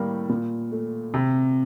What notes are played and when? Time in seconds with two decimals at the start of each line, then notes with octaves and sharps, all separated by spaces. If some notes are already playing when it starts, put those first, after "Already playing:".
Already playing: A2 G3 A#3
0.29 A#2
0.72 A3
1.14 C3